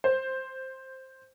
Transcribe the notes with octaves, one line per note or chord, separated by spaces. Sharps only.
C5